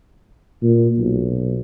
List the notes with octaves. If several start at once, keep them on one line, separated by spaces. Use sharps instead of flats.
A#2
B1